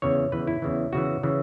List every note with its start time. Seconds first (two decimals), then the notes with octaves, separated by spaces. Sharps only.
0.02 E2 C#3 E3 C#5
0.32 E2 C#3 E3 B4
0.47 E4
0.62 E2 C#3 E3
0.92 E2 C#3 E3 F#4
1.23 C#3 E3